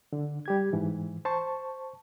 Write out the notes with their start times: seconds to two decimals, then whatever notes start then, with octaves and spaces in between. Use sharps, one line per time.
0.13 D3
0.46 G3 G4 G#6
0.73 G#2 E3
1.25 C5 A5 C#6